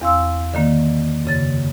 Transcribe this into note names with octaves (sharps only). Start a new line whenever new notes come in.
E2 C4 F5 C6 E6
D3 D#3 A#3
F#2 C#3 A6